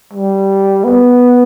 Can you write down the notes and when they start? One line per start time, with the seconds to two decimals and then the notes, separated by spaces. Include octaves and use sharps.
0.13 G3
0.84 B3